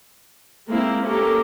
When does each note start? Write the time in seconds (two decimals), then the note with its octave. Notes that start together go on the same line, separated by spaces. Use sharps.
0.68 G#3 A#3 C4 E4
1.06 A#3 C#4 G4 A4 A#4